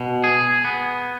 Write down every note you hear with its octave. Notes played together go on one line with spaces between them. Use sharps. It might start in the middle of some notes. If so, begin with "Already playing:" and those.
Already playing: B2
G#4
B3